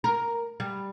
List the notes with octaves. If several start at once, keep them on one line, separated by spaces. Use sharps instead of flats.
A#4
G3